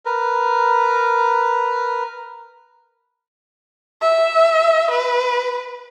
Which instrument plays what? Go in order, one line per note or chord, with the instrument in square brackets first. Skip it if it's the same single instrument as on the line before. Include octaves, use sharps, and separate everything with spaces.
[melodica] A#4 B4
[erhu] E5
B4